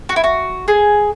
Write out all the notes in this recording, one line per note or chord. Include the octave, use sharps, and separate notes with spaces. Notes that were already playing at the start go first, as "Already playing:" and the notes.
F#4
E4
F#4
G#4